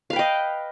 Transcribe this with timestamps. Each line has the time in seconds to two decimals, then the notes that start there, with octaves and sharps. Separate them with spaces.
0.10 F5
0.13 B4
0.16 G5
0.19 D#5